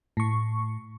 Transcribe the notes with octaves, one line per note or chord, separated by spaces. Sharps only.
A2 C#6